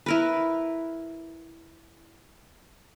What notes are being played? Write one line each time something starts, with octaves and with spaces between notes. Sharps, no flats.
E4 A#4 B4